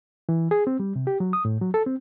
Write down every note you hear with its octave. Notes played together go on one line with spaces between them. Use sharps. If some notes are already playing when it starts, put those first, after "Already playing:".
E3
G#4
C4
G3
C3
G4
F#3
D#6
A2
F#3
A4
C4